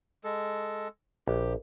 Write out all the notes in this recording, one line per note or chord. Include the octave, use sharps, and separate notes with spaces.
G#3 A4
A#1 G4